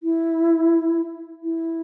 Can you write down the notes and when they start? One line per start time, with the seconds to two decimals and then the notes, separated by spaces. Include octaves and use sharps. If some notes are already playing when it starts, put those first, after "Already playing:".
0.03 E4
1.43 E4